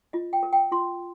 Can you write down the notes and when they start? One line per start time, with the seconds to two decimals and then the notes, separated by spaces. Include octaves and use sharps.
0.13 F4 D#5
0.33 G5
0.43 A#4
0.53 G5
0.71 F4 C6